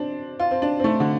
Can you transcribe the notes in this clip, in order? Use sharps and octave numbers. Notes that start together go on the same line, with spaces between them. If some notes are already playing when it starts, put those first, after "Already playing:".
Already playing: C4 D4
F4
C4
D4
C4
A3
D3